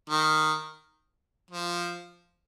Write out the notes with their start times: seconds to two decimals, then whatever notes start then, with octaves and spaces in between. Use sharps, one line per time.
0.09 D#3
1.51 F3